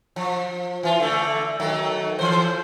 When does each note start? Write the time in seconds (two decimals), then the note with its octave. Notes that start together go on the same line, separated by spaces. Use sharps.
0.16 F3
0.83 E3 F4
1.00 D3 A3
1.60 D#3 F#3 A3
2.19 E3 C5